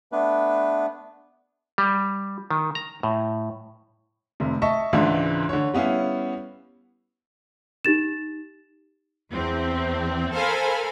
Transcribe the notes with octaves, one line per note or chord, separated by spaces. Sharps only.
A3 B3 D4 B4
G3
D#3
A#5
A2
F1 C3
D#5 E5 A5 C#6
C#2 G#2 C#3 E3 D4 E4
D3 C#5
G3 B3 C#4 E4 F5
D#4 G4 A6 E7
E2 C4
A4 A#4 C5 F5 G#5 B5